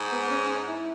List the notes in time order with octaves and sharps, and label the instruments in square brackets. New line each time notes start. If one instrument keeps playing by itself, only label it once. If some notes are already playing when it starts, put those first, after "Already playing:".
Already playing: [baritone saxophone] G#2
[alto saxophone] B3
C#4
E4